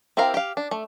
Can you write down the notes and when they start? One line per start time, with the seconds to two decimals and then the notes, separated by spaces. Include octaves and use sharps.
0.17 C4 E4 G4 A#4 F5
0.34 G4 F5
0.57 D4
0.71 A3